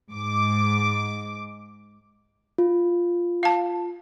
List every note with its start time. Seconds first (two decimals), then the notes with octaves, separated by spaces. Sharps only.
0.12 G#2 D6
2.58 F4
3.43 F5 A5